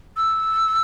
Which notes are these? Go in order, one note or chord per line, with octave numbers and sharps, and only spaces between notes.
E6